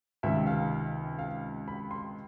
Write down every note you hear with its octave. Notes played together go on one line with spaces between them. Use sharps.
C#2 C3 D#3 E5
F5
F5
B5
C6